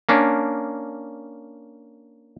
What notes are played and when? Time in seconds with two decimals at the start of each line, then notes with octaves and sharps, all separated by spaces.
0.09 A#3 C#4 D4